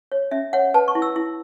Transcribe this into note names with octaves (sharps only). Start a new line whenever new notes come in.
C#5
C#4 E5
C#5 F#5
B4 A5
C#6
E4
E6
E4